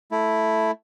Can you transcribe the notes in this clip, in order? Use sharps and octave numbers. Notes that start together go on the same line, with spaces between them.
A3 E4